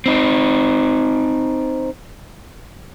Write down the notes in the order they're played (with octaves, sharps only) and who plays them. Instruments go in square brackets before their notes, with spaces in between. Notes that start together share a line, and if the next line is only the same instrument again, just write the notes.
[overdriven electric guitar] C4 D#4